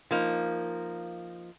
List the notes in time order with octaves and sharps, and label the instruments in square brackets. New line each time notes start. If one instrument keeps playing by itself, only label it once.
[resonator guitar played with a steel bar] F3 A#3 D#4